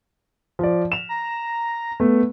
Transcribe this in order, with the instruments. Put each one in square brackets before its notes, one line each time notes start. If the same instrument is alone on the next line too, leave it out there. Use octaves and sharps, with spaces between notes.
[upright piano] F3 D5
E7 F7
[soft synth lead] A#5
[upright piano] A3 [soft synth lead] B3